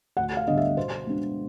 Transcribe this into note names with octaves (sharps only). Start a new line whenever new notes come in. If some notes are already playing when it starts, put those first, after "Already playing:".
D2 F#5
F5
D3 G3 B3 D4 D#5
E5
B2 C5
G#3 B3 D4